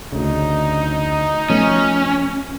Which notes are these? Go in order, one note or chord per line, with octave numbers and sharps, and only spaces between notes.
D2 C#3 D#4
F3 A3 B3 C#4